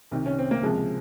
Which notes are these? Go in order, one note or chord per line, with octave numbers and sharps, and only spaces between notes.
C2 C3 D#3
C#4
C4
A#3
C#2 C3 F3 G#3